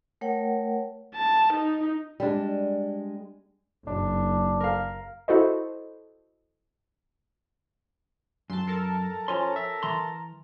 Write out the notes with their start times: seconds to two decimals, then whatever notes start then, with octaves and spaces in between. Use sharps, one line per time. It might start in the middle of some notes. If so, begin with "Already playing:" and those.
0.21 A3 A#4 C#5 F#5 G5
1.15 A5
1.53 D#4
2.20 G3 G#3 D4
3.87 F#1 D4
4.60 A#4 F5
5.28 E4 F#4 A4 C5 D#5
8.50 F#2 A5 C6
8.67 A4 A#4 A5
9.28 F3 C#4 C#5 G#5 C6
9.56 E5
9.83 E3 A#5 C6